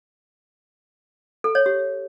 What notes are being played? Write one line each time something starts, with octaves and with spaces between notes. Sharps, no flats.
A4
C#5
G4